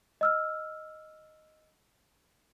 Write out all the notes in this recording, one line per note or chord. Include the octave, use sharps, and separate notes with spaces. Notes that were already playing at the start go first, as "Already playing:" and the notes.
D#5 E6 F6